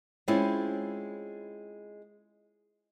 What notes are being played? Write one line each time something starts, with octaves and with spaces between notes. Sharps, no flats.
G#3 C4 C#4 E4 F4